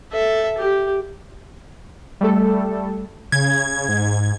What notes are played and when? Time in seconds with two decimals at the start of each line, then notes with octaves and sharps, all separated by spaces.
0.13 A4 E5
0.58 G4
2.21 G3 A3 A4
3.32 C#3 G#6
3.89 G#2